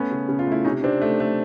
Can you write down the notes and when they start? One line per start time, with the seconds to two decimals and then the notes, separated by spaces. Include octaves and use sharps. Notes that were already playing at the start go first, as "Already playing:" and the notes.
Already playing: A3 B3 C#4
0.11 C#3
0.29 C#3
0.39 F4
0.47 A3 E4
0.65 C3 C#4 D#4
0.83 C3 C4 D4
1.02 A3
1.20 A3